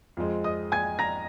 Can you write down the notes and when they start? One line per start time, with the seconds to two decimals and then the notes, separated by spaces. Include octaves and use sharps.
0.17 F2 F3 G#3 C4
0.44 D#5 D#6
0.72 G#5 G#6
0.99 A#5 A#6